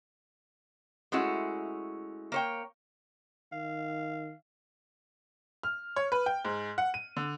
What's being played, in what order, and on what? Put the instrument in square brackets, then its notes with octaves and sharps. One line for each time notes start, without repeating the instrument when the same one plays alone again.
[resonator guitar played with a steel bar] G#3 A3 C#4 E4 F#4
A#3 C#5 G5
[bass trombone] D#3 [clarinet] F5
[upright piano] F6
C#5
B4
G5
G#2
F#5
D#7
D3